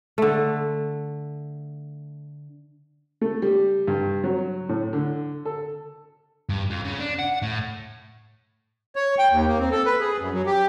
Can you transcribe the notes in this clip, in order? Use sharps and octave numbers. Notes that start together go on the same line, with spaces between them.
D3 A3
A3
G3
G2
F#3
A2
D3
A4
G2
F2
C#3
D4
F#5
A2
C#5
G5
D#2
A#3
C4
A4
B4
G#4
F#2
F#3
G4